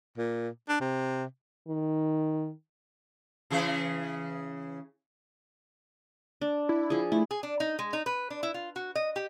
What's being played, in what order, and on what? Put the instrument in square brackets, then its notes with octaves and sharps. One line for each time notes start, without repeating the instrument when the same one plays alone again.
[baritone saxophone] A#2
D4
C3
[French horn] D#3
[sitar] C#3 E3 G#4
[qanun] D4
[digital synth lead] E4
[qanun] F3 G#4
[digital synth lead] A3 [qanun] E4
[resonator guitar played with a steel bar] G#4
D4
D#4
G#3
D#4
B4
D4
E4
F4
F#4
D#5
G4